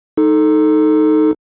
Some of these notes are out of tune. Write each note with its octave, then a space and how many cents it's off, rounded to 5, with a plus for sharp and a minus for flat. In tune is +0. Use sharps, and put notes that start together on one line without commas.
D#4 +0 A4 +0